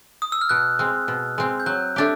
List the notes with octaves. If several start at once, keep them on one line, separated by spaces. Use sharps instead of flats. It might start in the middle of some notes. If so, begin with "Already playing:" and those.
D#6
E6
F6
B2 F#6
G#3 C4
B2
G#3 C4
G6
F#3 F#6
A3 D4 G4